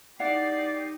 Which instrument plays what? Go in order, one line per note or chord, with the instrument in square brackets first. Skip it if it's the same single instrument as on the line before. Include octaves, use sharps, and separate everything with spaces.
[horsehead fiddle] D#4 G4 [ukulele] E4 F#5 [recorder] D5 [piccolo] C7